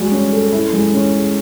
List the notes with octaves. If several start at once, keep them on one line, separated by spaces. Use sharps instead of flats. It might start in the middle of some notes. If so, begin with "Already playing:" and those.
Already playing: G3 G#3 F#4
C#4
A4
E4
G#3
C#4
G#4